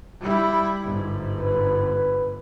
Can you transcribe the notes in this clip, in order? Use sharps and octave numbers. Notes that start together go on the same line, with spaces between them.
G3 E4
G1 G#2
B4